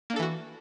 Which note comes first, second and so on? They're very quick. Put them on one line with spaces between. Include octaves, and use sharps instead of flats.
A#3 D4 A4 E3 F#4